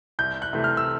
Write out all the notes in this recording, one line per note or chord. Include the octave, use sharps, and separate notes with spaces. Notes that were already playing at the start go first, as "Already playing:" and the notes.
C2 G6
F#6
C3 E3 A3
F6
E6